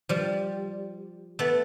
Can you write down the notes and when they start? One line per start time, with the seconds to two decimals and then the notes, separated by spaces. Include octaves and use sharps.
0.09 F3 G3
1.39 A3 B3